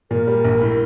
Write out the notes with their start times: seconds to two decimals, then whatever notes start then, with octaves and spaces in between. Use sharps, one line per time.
0.11 A#2 A#4
0.27 G3
0.45 A#1
0.61 A2